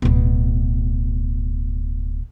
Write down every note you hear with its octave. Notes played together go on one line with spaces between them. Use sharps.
D1 B2